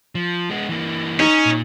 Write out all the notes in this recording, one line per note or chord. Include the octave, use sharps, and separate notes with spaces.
F3
G#3 B3
E3 A#3
C#4 D#4
A#2